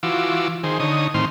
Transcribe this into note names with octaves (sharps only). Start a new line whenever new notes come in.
E3 F4 F#4 D6 E6
D#3 G#4 C5
D3 D#4 C#5 D#6
A2 D#3 C4 C6 F6